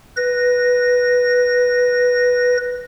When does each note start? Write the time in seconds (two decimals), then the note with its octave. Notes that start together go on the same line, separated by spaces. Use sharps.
0.17 B4 A#6